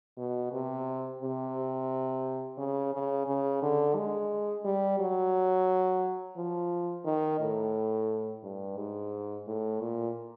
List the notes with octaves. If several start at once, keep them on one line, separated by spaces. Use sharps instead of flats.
B2
C3
C3
C#3
C#3
C#3
D3
G#3
G3
F#3
F3
D#3
A2
G2
G#2
A2
A#2